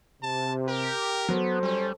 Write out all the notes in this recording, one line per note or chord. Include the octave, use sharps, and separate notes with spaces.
C3 A5
G4 A#4
F#3 B3 A4 C5
G3 C#4